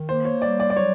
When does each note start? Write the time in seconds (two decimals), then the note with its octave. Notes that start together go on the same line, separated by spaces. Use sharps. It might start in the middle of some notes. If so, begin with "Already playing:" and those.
Already playing: D#3
0.08 A#3 C5
0.25 C#5
0.42 G3 D5
0.60 D5
0.70 D5
0.77 F#3 C#5